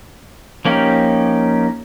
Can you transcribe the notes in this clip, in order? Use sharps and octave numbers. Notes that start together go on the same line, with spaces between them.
F3 A#3 C#4 D#4 G4